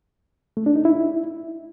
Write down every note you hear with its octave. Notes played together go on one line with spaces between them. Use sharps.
A3
D4
D#4
E4